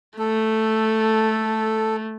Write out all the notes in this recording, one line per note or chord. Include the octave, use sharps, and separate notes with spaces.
A3 A4